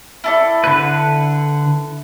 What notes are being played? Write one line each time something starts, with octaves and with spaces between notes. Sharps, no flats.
E4 A4 D5
D3 B4